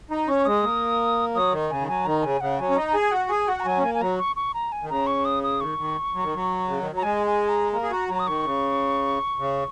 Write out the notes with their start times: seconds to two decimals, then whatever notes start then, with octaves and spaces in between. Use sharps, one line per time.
0.11 D#4 A#5
0.28 C#4 C#6
0.39 C#6
0.45 G#3 D#6
0.63 A#3
1.35 F#3 D#6
1.52 D#3
1.70 C#3 G#5
1.81 D#3
1.88 F#3 G#5
2.05 D#3 A#5
2.23 C#3 G#5
2.40 C#3 F#5
2.59 F#3 G#5
2.69 C#4
2.76 D#4 A#5
2.94 G#4 G#5
3.11 F#4 F#5
3.29 G#4 G#5
3.48 F#4 F#5
3.60 A#5
3.65 F#3 G#5
3.78 C#4
3.83 A#3 G#5
3.94 G#5
4.01 F#3 A#5
4.18 C#6
4.36 C#6
4.54 A#5
4.72 G#5
4.82 D#3
4.89 C#3 A#5
5.07 C#6
5.25 D#6
5.43 D#6
5.60 D#3 C#6
5.78 D#3
6.14 F#3
6.24 D#3
6.35 F#3
6.68 C#3
6.80 D#3
6.91 F#3
6.97 A#5
7.03 G#3 G#5
7.27 G#5
7.49 A#5
7.73 A#3 A#5
7.83 G#4
7.91 F#4 A#5
8.09 F#3 A#5
8.19 D#6
8.27 D#3 C#6
8.44 C#3
9.39 C#3